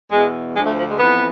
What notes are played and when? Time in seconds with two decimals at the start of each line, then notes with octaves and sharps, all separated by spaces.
0.11 E2 B2 G#3
0.56 D2 D3 F3 G#3
0.66 A3
0.78 F3
0.89 G#3
0.99 F2 E3 B3